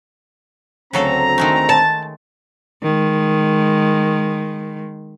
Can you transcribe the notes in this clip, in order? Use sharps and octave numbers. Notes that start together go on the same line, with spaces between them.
D2 C#3 F#3 C4 A4 A#5
D#3 G#3 A3
A5
D#3 G#3